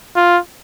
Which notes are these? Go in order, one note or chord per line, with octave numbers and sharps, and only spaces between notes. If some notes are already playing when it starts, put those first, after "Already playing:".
F4